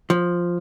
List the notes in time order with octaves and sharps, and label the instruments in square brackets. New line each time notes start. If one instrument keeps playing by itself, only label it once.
[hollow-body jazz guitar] F3